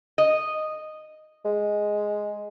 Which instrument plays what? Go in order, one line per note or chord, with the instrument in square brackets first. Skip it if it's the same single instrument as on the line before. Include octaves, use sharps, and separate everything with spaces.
[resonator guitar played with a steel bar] D#5
[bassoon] G#3